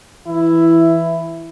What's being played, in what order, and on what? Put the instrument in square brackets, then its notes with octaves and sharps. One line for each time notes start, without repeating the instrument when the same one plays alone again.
[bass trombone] E3 [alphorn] E4